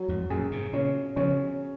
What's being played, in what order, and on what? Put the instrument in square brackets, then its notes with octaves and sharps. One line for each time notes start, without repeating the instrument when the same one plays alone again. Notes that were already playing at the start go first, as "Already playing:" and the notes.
Already playing: [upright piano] F#3
[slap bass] F2 G#2
[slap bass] F#2 A#2 [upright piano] G#4
[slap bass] G#2 C3
[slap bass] A#2 C#3 [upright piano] C#4
[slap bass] C#3 F3 [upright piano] C#4